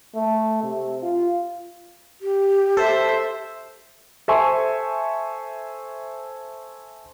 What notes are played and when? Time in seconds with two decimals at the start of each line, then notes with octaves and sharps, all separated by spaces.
0.15 A3
0.63 C3
1.03 F4
2.21 G4
2.77 A4 C5 E5
4.28 A4 C5 E5 G#5 C6 C#6